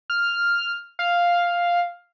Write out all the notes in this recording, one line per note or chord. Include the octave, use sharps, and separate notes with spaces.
F6
F5